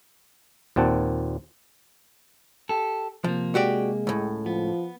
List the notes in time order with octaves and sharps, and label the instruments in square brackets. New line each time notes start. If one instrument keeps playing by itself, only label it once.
[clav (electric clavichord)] D#2 A#2 C4 F#5 A5
[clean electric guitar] G4 A4
[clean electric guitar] C3 A#3 [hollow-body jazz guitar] F3
[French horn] G#3 [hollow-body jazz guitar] F#4 G4 D5
[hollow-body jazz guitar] C#2 A2
[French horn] F3 [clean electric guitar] B3